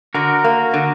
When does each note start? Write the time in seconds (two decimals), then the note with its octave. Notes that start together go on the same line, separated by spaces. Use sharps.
0.14 D3 F#4 A#4
0.44 A#3
0.74 D3